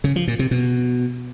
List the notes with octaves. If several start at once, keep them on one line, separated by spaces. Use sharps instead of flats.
C#3
F3
A#2
C3
B2